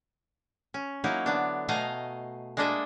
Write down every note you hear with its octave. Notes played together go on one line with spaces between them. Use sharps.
C#4
F#3 A#3 D#4 E4
D3 B3 D4
B2 A3 D#5 F5 G#5 A#5
G#3 A#3 D4 A4 D#5 E5